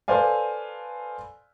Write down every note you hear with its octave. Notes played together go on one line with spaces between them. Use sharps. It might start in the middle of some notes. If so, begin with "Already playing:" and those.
A4 B4 C5 D5 F5 G#5